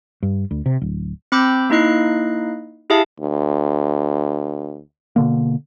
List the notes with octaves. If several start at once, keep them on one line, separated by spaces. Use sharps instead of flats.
G2
D2
C3
D1
C4 B5 D6 E6 G6
A#3 D#4 E4 D#5 F#6 C7
E4 G4 G#4 E5 F5 A5
D2
B2 D3 A#3